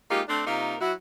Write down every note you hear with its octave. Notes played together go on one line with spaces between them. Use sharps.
G#3 A#3 D#4 F4 G4
A3 C4 D4
C3 A#3 D#4 F4 A#4
F#3 E4 F#4